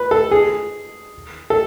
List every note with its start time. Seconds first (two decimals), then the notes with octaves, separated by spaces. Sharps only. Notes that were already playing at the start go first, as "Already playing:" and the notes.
Already playing: B4
0.11 A4
0.31 G#4
1.50 A4